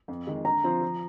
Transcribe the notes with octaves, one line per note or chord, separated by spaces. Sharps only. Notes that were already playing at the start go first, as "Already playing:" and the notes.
F2
D#3 G#3
D3 A#5
F3 C4 F4 C5
F3